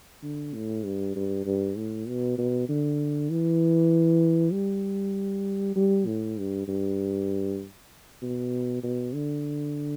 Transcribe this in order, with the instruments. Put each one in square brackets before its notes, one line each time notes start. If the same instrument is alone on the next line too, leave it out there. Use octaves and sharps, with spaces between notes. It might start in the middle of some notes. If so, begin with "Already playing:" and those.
[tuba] D3
A2
G2
G2
G2
A2
B2
B2
D3
E3
G3
G3
A2
G2
G2
B2
B2
D3